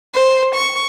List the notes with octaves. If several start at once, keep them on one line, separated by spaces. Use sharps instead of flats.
C5
C#6